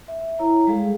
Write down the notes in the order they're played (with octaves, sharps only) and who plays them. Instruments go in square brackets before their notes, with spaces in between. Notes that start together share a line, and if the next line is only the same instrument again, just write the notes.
[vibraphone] E5
E4 C#5 A#5
G3 G#3 G#4 A4 F5